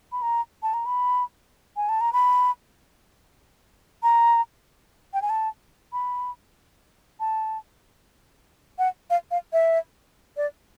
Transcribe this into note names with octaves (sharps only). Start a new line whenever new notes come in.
B5
A#5
A5
A#5
B5
G#5
A5
A#5
B5
A#5
G5
G#5
A5
B5
A5
F#5
F5
F5
E5
D5